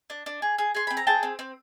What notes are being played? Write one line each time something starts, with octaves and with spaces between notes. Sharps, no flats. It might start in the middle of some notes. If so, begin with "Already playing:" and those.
D4
D4
G#4
G#4
G#4 C6
C4 B5
A#5
G#4 G5 A5
C4
C4